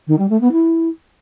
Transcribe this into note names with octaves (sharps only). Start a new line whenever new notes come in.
D#3
G3
A3
B3
E4